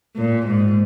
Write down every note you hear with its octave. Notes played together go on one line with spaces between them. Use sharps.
A#2
G#2